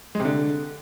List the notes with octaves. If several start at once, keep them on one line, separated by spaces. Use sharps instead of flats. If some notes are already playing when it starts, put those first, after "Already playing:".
G#3
C3
D3